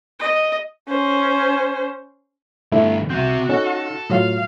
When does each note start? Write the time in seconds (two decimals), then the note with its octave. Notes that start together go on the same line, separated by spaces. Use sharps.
0.19 D#5
0.89 C#4 C5
2.72 G2 D3 A3 D4 E4
3.10 C2 C4 F#4 E5 G6
3.49 C#4 D#4 A4
4.10 A2 F#3 F4 F5